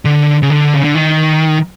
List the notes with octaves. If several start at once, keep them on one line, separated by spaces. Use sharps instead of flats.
D3
C#3
D3
C#3
D3
D#3